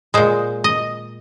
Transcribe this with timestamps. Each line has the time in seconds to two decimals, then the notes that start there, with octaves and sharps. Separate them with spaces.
0.14 A#2 G#3 C5
0.64 D#5